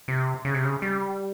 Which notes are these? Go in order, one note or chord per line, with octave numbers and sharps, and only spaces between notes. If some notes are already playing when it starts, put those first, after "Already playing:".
C3
C#3
C3
C#3
G3